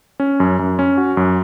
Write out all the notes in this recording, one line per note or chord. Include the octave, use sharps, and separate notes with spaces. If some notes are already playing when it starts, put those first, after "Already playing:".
C#4
F#2
F#2
C#4
F#4
F#2